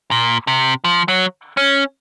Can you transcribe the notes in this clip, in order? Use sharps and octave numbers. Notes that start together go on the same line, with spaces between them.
A#2
C3
F3
F#3
C#4